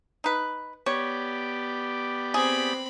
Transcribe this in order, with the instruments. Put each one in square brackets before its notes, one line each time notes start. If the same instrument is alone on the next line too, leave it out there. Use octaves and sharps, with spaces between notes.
[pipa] D#4 B4
[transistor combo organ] B3 G4 D5 [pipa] C#5
[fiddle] C4 B5 [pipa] G#4